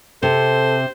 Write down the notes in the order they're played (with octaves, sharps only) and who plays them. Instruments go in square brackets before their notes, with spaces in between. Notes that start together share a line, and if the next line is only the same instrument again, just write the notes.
[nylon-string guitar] C3 [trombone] A4 [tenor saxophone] C5